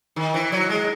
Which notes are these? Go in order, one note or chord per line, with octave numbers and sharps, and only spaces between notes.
D#3
E3
F#3
G#3